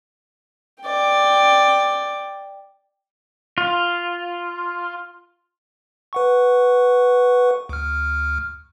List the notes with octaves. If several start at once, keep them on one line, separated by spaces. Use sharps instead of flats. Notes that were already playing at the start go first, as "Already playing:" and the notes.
D5 G5
F4
B4 F#5 C#6
D2 F6